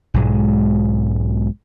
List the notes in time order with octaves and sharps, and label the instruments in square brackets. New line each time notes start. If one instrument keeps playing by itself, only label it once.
[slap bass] B1 G#2 G#3